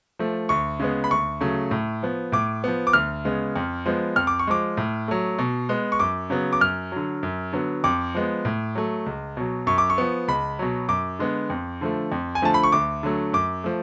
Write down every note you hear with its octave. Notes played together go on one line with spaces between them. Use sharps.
F3 A3
D2 C#6
C#3 G#3 B3
B5
D2 C#6
C#3 F#3 A3
A2
F3 B3
A2 D6
F3 B3
D6
D2 F6
C#3 G#3 B3
F2
F3 G#3 B3
F2 F6
D6
C#6
F3 G#3 D6
A2
F#3 A3
B2
G#3 B3
C#6
F#2 D6
C#3 F#3 B3
D6
F#2 F6
D3 F#3
F#2
D3 F#3 B3
F2 D6
F3 G#3 B3
A2
F#3 A3
C#2
B2 F#3
F#2 C#6
D6
C#6
F3 B3
C#2 B5
B2 F#3
F#2 D6
D3 G#3 B3
F2
D3 F3 A3
F2
G#5
D3 F3 A3 A5
B5
C#6
D2 D6
D3 F#3 A3
F#2 D6
F3 A3